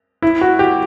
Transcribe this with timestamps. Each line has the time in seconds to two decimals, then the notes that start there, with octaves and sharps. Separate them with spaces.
0.22 E4
0.41 F#4
0.59 G4